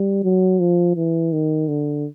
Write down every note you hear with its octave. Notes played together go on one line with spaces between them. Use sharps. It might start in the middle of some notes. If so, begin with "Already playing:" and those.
Already playing: G3
F#3
F3
E3
D#3
D3